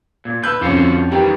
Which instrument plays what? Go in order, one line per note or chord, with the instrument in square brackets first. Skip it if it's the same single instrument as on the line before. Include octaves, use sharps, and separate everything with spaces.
[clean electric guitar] A#2
[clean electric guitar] B4 [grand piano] E6 G6
[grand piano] F2 C#4 [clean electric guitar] D3 F4 F#4
[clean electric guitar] D#3 E3 G3 [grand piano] G4